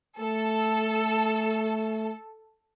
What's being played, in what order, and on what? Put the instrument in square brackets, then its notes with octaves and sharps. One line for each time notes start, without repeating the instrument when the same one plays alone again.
[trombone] A3 [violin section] A4